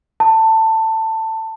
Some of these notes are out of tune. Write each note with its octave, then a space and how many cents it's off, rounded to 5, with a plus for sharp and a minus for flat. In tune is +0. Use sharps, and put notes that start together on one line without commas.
A5 +15